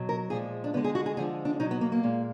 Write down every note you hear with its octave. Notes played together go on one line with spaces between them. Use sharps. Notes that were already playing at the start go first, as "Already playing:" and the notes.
Already playing: B2 F#3
A#4
A#2 F3 G#3 G#4
D4
D3 G#3 B3
G#4
F#4
G#4
D3 F3 G#3 G#4
D4
B2 F#3 D#4
B3
A#3
A#3
A#2 G#3